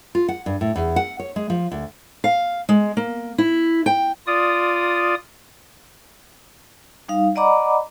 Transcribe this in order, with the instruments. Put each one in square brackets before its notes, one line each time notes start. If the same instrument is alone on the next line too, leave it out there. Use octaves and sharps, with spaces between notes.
[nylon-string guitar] F4
F#5
G2
A2
E2
F#5
C#5
G#3
F3
D2
[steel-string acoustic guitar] F5
G#3
A#3
E4
G5
[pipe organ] F4 D5 D#6
[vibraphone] G3 D#4 F5
D5 D#5 F#5 A#5 B5 D6